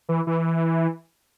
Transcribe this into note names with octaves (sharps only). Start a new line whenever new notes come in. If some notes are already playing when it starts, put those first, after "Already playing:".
E3
E3